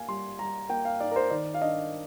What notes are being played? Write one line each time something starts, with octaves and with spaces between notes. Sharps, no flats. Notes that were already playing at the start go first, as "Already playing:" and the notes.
Already playing: A#3 F5 G#5
G3 C6
G3 A#5
A#3 G5
F5
D#4 D5
A#4
C5
D#3 D5
F5
D4 D#5